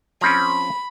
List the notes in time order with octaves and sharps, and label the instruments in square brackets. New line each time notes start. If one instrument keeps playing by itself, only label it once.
[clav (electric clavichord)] F3 C4 C#4 [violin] B5